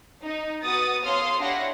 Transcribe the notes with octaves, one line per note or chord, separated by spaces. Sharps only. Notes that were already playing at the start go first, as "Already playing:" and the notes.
D#4
B3 F#4 B4 F#5 D#6 A6
A4 C#5 F5 C6 D#6 F6
D4 E4 G4 C#5 F#5 A#6